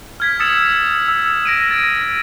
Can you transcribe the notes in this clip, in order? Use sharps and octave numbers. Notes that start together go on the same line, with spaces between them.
F6 G#6 B6
D#6 E6 A6 C#7 E7
E6
A#6 D7 D#7
A6
A#6